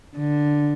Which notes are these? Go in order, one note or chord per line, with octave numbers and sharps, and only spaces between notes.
D3